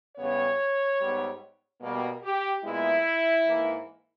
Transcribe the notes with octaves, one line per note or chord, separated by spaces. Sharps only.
E2 C#3 G3 B3 C#5
G#2 G3 B3
B2 G3 A#3
G4
A#2 G#3 B3 E4
G#2 E3 A#3